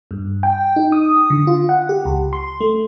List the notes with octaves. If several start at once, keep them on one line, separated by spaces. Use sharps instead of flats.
G2
G5
D#4
D#6
D3
F4
F#5
G4
C#2
C6
A3